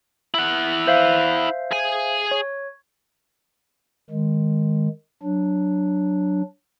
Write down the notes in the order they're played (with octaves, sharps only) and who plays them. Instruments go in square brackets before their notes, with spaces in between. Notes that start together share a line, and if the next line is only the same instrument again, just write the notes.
[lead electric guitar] E4 F#5
[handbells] C5 E5 F5
[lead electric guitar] G#4 G#5
[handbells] C#5
[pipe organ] D#3 G#3
F#3 D4